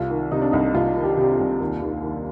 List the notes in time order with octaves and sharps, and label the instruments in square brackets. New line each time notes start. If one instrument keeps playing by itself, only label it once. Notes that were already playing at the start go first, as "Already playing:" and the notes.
Already playing: [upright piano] C2 F4
D#3
C3 D#4
D4
C2 D#4
C2 F4
D#3
G4
C3 G4
F4
C2
D#2
D#2
D#3